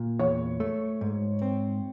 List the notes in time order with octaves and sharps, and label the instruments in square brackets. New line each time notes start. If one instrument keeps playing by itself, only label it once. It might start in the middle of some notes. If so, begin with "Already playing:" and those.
Already playing: [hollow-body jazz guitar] A#2
[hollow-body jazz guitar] E2 [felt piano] C#5
[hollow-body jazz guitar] A3
G#2
C4